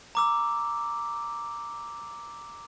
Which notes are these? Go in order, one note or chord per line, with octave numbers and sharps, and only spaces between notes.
A#5 D6 E6